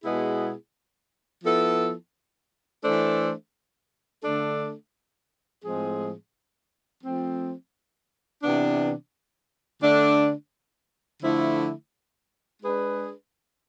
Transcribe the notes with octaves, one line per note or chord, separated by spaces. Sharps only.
B2 G#3 B3 E4 G#4
F3 B3 E4 A4
E3 A3 D4 A4 C5
D3 A3 D4 A4
A2 F3 G#3 C4 G#4
F3 A3 C4
C3 E3 B3 D4
D3 A3 D4
D3 F3 A3 E4
G#3 D4 G#4 B4